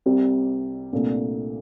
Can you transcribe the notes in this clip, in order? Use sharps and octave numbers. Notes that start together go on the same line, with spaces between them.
C2 C3 G3 C4
C2 A#2 A3 D4